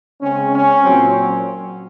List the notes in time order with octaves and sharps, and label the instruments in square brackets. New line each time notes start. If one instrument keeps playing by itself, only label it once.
[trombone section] C#3 G#3 C4 C#4
C#4
A#2 F#3 C4